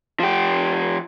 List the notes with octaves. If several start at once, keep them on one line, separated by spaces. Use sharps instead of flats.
F3 G4